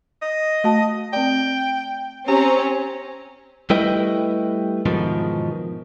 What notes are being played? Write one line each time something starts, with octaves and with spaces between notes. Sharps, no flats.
D#5
A3 F#4 A5
C4 D5 G5
C4 C#4 G4 C5 A#5
G3 A3 E4 B4 D#5 G5
E2 G#2 B2 D#3 F3